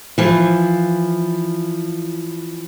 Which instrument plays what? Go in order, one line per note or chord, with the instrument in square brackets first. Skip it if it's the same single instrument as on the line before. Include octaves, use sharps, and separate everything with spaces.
[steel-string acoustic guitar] E3 F3